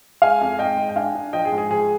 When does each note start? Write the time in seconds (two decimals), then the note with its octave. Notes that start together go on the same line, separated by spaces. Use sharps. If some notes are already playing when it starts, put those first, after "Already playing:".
0.22 G#3 F5 G#5
0.41 F2
0.59 G#2 D#5 G5
0.77 G#2
0.89 G5
0.96 D4 F5 G#5
1.15 D4
1.33 F3 D#5 G5
1.45 G#4
1.52 G#2
1.58 G#4
1.70 F3 G#4